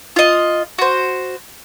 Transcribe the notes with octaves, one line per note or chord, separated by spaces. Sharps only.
F4 D#5
F#4 C5